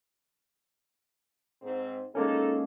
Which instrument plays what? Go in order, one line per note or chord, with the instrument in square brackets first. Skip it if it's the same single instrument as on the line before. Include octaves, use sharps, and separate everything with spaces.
[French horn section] G#2 C4
[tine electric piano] G#3 A#3 C#4 [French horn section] D#4 F4 A4